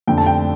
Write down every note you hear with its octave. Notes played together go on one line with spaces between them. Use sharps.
F2 D3 A3 G5
A5
G5